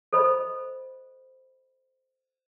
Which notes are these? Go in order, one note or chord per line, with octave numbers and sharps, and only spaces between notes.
A4 C5 D#5 B5